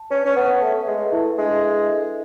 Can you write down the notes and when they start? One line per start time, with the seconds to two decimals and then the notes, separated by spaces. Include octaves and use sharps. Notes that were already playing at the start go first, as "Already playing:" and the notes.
Already playing: A5
0.10 C#4 B4
0.25 C#4
0.36 B3 A5
0.61 A3 E5
0.87 G#3 B4
1.12 A3 E4
1.38 G#3 D4
1.63 E5
1.89 A4